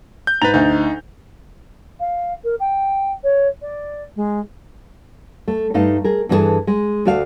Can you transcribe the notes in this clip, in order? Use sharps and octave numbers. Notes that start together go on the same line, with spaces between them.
G6
G#2 B4 A#5 A6 F7
D2 D#4
F5
A#4
G5
C#5
D5
G#3
A3
G2 A3 D#4 F5
G#4 A#4
G2 E3 D4 F#4 G#4 A4
G#3
D2 A3 F#4 D5 F5